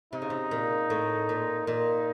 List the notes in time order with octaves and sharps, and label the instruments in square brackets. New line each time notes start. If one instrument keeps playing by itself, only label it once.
[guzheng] C3 [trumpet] D#4
[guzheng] C#3
C3
A#2
A2
A#2
[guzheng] A#2 [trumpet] D#4